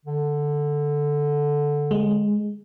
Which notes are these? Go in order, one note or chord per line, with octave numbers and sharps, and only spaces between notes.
D3
G#3